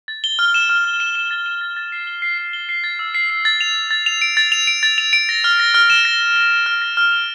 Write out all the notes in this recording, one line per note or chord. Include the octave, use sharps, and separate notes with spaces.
A6
G7
F6
E7
F6
F6
E7
E7
A6
E7
A6
A6
C7
G7
C7
C7
G7
C7
A6
E6
C7
C7
A6
F7
F7
A6
F7
D7
A6
F7
D7
A6
F7
D7
A#6
F6
A#6
F6
E7
A#6
A#6
A#6
A#6
F6
A#6
F6
F7